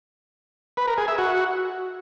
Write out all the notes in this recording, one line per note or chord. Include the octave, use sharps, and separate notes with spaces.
B4
A#4
G#4
E5
F#4